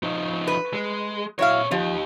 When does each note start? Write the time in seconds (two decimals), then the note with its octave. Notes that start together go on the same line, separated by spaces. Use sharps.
0.03 F3 D#4
0.47 B4
0.73 G#3
1.39 A#2 F#3 E4 C#5 F5
1.71 F3 D#4 G4